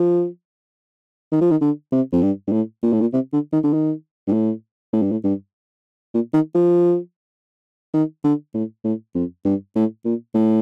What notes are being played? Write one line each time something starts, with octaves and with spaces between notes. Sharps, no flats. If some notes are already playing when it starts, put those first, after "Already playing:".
Already playing: F3
D#3
F3
D#3
D3
C3
F2
G2
G2
A2
A#2
A2
A#2
C3
D3
D#3
D3
D#3
G2
A2
A2
G2
A2
G2
A#2
D#3
F3
D#3
D3
A2
A2
F2
G2
A2
A#2
A2